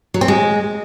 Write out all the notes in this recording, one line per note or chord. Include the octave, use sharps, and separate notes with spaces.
F#3
C4
G#3